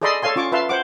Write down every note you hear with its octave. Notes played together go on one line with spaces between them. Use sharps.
G#4 A4 D5 D#5 B5 C6
A4 C#5 F5 G#5 C6
C#4 F4 C#6 D6
F4 B4 E5 F5 A5 C6
C5 F#5 D6